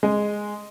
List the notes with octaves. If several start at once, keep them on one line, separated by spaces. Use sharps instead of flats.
G#3 D#5